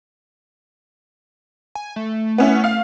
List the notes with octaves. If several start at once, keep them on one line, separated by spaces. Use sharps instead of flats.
G#5
A3
B3 C#4 E4
F5